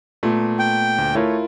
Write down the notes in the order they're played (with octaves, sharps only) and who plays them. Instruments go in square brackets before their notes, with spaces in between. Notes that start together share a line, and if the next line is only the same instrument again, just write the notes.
[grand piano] A#2 A3 B3
[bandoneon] G5
[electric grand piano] D2
[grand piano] A3 C#5 [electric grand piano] E4 F4 A#4